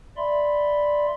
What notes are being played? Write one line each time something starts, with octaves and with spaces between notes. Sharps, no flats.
D5 E5 B5 C6